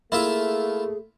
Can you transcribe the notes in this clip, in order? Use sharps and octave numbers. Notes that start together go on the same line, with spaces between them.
A3 A#3 E4 F4 G#4 E5